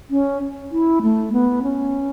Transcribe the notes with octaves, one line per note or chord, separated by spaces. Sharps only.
C#4
E4
A3
B3
C#4